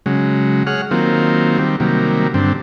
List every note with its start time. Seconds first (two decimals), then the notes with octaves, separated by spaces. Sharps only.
0.06 C#3 F#3 G#3
0.67 G#4 C#5 F#5 F6
0.91 D#3 F#3 A#3 C4 F4
1.58 D#3 G3 C4
1.80 C3 D#3 F#3 G3 A#3
2.34 G2 D3 C4